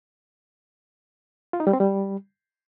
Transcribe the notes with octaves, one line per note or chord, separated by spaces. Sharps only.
F4
D#4
G3
C4
G3